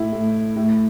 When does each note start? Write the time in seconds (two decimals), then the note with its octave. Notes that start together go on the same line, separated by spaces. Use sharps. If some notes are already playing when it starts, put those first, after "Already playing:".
Already playing: A2 E4
0.12 A2
0.56 A2